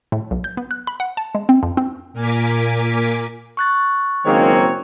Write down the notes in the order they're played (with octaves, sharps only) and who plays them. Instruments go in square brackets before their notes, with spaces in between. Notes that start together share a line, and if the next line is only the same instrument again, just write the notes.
[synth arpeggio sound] A2
B1
G6
B3
F#6
B5
F#5
A5
G#3
C4
F2
C4
[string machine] A#2 A#3 G#5 D6 B6
[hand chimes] C#6 F#6 A6
[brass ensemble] F#1 A#3 C#5 [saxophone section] D#3 F#3 G#3 [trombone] C4